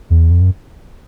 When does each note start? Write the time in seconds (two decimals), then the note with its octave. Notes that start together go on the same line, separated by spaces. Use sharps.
0.10 E2
0.31 F2
0.41 F#2